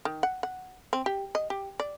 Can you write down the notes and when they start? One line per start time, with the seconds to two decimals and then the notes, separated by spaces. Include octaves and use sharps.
0.05 D#3
0.23 F#5
0.43 F#5
0.93 C4
1.06 G4
1.35 D#5
1.50 G4
1.80 D5